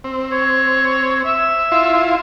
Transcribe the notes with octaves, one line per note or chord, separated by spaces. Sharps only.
C4
C#5
E5
E4 F4 C6